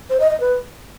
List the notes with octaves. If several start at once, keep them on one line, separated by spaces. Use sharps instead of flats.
C5
D#5
D#5
B4